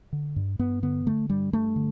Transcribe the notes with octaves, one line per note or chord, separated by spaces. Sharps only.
D3
G2
G2 B3
D3 B3
D3 A3
G2 G3
G2 A3
D3